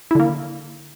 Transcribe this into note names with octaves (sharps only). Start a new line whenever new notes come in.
D3 A#3 E4